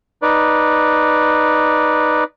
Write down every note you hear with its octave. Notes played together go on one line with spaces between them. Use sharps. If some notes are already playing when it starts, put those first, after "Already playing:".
D#4 B4 D5